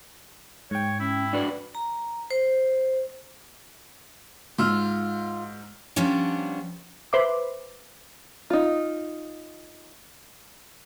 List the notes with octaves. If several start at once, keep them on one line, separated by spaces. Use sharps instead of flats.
G#2 C#5 G5
C#4 E4
D4 F#4 B4 D5
A#5
C5
G#2 F4 E6 F6
F3 G3 B3 C#4 D4
B4 C5 E5 D6
D#4 F4